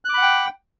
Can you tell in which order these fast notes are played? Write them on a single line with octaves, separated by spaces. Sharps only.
F#6 D6 B5 F#5 G5